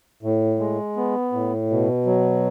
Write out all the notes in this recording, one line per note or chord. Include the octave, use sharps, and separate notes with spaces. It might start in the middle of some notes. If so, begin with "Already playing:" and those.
A2
G#3
B3
A2
B2
F#3